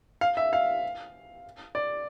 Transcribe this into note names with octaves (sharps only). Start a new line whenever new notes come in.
F5
E5
F5
D5